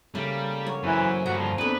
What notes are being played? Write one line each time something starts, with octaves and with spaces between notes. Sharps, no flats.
C#3 G3 A3 A#3 F5
A#3 F#4 C#5
F#2 E3 C5
G2 D3 F#4 A#5
F3 C5 G#5
F2 B3 D4 B4